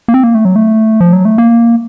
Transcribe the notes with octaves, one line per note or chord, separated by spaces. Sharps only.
A#3
C4
A#3
A3
F#3
A3
F3
F#3
A3
A#3